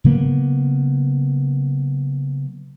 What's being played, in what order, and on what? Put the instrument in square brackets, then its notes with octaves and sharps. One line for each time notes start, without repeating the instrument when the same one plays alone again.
[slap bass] C#3 F#3 A#3 B3